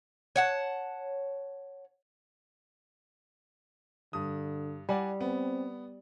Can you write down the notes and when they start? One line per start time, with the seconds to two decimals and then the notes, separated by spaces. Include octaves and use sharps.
0.36 C#5 F#5 A5
4.13 G2 D3 D#6
4.89 G3 D5 F#5 G#5
5.21 B3 C4